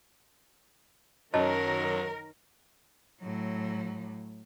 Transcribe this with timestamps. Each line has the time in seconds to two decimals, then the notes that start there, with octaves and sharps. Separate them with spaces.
1.34 F#2 D#3 F#3 A#4 C#5 D#5 A5
3.21 A2 F#3